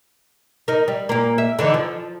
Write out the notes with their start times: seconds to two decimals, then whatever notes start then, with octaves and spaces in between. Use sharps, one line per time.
0.68 D#4 A#4
0.88 G3
1.09 A#2 A#3
1.38 E5
1.59 D3 E3 D#4
1.74 F3